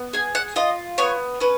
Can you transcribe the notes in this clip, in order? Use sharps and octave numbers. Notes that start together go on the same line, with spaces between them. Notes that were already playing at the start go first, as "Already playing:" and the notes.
Already playing: B3
G#4 G#5
F#5
F4 D#5
B3 C#5
C#4 B4